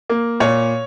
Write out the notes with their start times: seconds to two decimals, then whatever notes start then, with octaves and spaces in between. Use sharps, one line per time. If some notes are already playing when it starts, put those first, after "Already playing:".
0.10 A#3
0.40 A#2 C#5